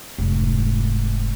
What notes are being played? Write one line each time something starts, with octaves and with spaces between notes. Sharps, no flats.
F1 G#2